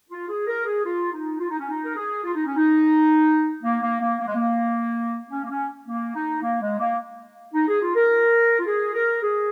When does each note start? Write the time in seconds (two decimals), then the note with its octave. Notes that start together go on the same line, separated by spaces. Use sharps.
0.09 F4
0.29 G#4
0.47 A#4
0.65 G#4
0.84 F4
1.12 D#4
1.39 F4
1.50 D#4
1.59 C#4
1.69 D#4
1.85 A#4
1.95 G#4
2.24 F4
2.35 D#4
2.46 C#4
2.56 D#4
3.63 A#3
3.82 A#3
4.00 A#3
4.20 A#3
4.27 G#3
4.35 A#3
5.31 C#4
5.43 A#3
5.50 C#4
5.87 A#3
6.14 D#4
6.42 A#3
6.61 G#3
6.79 A#3
7.54 D#4
7.68 G#4
7.82 F4
7.95 A#4
8.59 F4
8.66 G#4
8.94 A#4
9.22 G#4